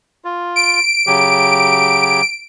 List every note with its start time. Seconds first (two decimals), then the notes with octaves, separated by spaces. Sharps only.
0.25 F4
0.56 D7
1.07 C#3 F#3 G4